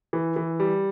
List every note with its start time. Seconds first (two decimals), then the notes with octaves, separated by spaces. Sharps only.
0.13 E3
0.36 E3
0.60 G3